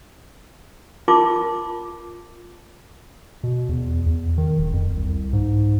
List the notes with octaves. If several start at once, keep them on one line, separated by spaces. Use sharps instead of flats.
F4 A#4 A5 C6 D6
B2
E2
E2
D#3
D#1
F2
C2
G#2